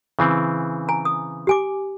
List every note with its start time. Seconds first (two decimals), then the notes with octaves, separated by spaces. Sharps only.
0.19 C#3 E3 C4
0.89 G#5 A#5
1.05 D#6
1.47 G4 G#5 D6